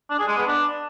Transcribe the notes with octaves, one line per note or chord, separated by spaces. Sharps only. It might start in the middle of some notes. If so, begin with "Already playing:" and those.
D4
G#4
G#3
B3
D4